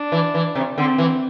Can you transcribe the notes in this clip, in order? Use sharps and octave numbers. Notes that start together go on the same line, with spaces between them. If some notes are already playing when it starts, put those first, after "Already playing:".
Already playing: D4
E3
E3
C3
D3 C4
E3